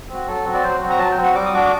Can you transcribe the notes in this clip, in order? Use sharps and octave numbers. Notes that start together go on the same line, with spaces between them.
C4 F#4
F#3 A4
C4 F#4
D5
F#3 C5
C4 F#4
A#5
F#3 A5
G5
C4 F#4
F#5
G3 D6
D#6
D4 F#4 D6